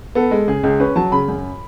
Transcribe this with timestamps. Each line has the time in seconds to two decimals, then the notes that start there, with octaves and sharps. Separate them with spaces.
0.15 B3 A4
0.31 G#3
0.47 C#3 G#4
0.63 C#2
0.80 C#4 B4
0.96 F#3 A5
1.12 C#3 B5
1.28 F#2